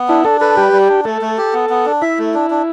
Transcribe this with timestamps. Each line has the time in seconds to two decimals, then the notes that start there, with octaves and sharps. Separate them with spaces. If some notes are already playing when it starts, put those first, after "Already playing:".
Already playing: B3
0.08 D4 E4
0.25 D4 A4
0.41 A4 B4
0.57 G3 G4
0.72 G3
0.89 D4
1.05 A3 A4
1.22 A3
1.38 G4
1.53 B3
1.70 B3
1.86 D4
2.02 E4 E5
2.19 A3
2.34 D4
2.50 D4